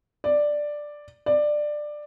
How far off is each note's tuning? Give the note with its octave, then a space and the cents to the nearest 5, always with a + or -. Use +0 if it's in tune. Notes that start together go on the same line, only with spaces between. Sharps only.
D5 +5
D5 +15